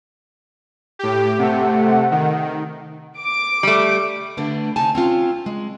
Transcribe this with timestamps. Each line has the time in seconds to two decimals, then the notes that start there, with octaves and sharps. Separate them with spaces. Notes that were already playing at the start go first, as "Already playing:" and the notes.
0.99 A2 G4
1.39 C3 A3 F#5
2.11 D#3
3.20 D6 D7
3.63 G3 A3
4.37 D3 A3 B3 D4
4.76 C3 D#4 G#5 A5
4.95 C4 C#4 F4
5.46 G#3